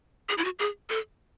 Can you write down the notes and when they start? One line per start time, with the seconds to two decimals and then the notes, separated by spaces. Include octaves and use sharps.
0.29 G#4
0.38 E4
0.44 F#4
0.59 G#4
0.89 A4